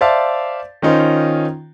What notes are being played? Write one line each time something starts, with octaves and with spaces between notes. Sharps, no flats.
C5 D5 E5 F5 A5
D#3 C#4 D#4 F4 C5